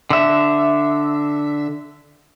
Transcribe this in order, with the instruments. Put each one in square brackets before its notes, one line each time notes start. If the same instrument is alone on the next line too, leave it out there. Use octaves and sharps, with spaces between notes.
[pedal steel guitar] D3 E5